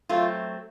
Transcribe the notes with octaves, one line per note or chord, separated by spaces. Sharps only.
F#3 A3 C4 F4